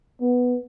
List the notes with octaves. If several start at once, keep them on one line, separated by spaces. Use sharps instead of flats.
B3